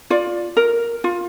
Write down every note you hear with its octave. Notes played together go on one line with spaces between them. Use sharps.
F4 D5
A#4
F4